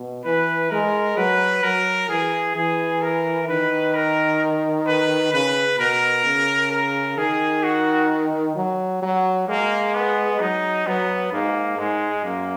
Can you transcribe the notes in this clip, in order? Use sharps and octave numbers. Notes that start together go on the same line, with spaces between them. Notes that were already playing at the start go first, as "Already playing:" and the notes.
Already playing: B2
E3 B4
G#3 A#4
F#3 B4
F#3 A#4
E3 G#4
E3 G#4
A#4
D#3 B4
A#4
B4
C#3 B4
B2 A#4
C#3
A#4
D#3 G#4
F#4
F#3
F#3
G#3 A#3
B3
F#3 D#4
F#3 B3
G#2 A#3
G#2 G#3
F#2 A#3